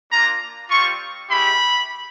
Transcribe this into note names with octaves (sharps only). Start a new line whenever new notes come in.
A#3 D4 F4 A#5
G3 C4 F4 C#6
G#3 C#4 E4 G4 B5